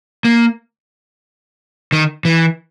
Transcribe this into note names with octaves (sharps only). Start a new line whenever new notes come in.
A#3
D#3
E3